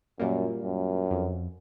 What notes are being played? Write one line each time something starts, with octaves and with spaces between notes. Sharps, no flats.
F#2 A#2 G3 A#3
F#2
F2